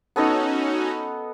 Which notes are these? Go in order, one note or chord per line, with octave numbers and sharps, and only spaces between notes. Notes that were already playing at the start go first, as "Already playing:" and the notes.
B3 C#4 D#4 F#4 A4 D#5